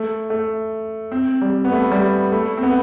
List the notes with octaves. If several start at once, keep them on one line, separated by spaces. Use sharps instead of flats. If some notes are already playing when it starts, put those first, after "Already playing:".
Already playing: A3
A3
C4
G3
B3
A3
G3
A3
C4
B3